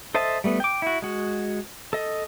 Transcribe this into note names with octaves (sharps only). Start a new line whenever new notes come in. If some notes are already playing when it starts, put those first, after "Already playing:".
A4 C5 D#5 E5 A5
G3 A3 B3
G5 D6
E4 F#4
G#3 F#4
A4 D#5